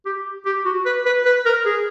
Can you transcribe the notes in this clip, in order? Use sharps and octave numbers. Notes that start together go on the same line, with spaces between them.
G4
G4
F#4
B4
B4
B4
A#4
G#4